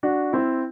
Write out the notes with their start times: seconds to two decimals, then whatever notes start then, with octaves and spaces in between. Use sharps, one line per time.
0.03 D4 F#4
0.33 C4 E4